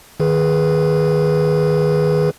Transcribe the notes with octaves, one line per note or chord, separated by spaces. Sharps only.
D#3 G#4 B4